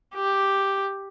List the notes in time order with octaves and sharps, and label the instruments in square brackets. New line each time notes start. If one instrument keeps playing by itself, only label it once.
[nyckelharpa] G4